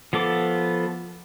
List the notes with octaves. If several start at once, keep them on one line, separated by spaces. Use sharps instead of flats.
F3 B3 A4 D6